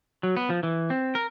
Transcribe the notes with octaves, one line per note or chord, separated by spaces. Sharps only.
F#3
B3
F3
E3
C4
A#4